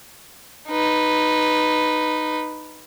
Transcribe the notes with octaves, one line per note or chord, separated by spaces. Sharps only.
D#4 B4